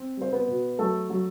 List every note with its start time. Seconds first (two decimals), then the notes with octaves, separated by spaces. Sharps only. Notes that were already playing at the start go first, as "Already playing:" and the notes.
Already playing: C4
0.17 G3 C5
0.33 B3 B4
0.48 B2
0.79 F#3 A3 A4
1.10 F#3